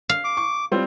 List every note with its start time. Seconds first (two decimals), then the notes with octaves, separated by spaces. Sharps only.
0.09 F5
0.24 D6
0.37 C#6
0.72 G3 C4 F4